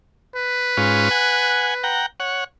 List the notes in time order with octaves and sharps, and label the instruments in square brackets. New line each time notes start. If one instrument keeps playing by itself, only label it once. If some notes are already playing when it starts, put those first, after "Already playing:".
[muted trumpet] B4
[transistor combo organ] G#2 C#4 F4
F#5 G#5
F#5 G5 A#5
C#5 F#5